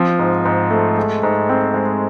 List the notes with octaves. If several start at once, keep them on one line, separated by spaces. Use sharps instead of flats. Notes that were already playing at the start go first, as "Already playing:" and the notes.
Already playing: F3 C4
G#2
G#2
A3
G#3
G#2
C4
G#3